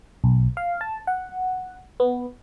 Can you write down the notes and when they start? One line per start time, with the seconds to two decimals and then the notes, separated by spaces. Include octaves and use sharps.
0.24 B1
0.57 F5
0.81 A5
1.07 F#5
2.00 B3